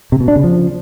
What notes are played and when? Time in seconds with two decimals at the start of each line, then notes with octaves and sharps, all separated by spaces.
0.12 C3
0.20 B2
0.28 D4
0.36 C#3
0.44 F3